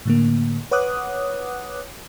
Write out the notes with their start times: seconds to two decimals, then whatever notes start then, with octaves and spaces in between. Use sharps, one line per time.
0.05 A2 D3 A#3
0.71 B4 C#5 F#5 D6 D#6 F#6